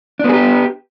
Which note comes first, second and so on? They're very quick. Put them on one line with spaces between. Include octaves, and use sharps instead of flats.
D4 B3 G#4 G4